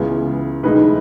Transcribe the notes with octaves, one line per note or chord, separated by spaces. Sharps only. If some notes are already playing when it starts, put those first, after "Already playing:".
Already playing: C#2 C#3 E3 B3
B1 A2 E3 G#3 D#4 B4